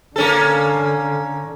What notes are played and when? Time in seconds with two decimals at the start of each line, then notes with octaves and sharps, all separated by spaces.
0.16 D3 A#3 C#4 A4